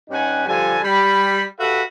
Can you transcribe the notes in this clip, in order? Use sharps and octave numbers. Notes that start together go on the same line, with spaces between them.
G2 C#4 D#4 G4 F#5 G#5
D3 F3 G3 A4 G#5
G3 B5
F#4 G4 A4 B4 E5 F5